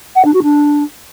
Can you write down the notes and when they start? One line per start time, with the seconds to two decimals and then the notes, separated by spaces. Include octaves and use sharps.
0.15 F#5
0.24 D4
0.33 F#4
0.42 D4